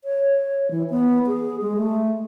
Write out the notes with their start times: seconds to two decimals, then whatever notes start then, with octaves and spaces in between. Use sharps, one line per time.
0.04 C#5
0.71 E3
0.90 B3
1.27 G#4
1.61 G#3
1.77 A3